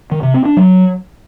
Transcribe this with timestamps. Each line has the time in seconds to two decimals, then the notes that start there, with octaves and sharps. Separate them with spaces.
0.12 D#3
0.23 C3
0.34 C4
0.45 D4
0.57 F#3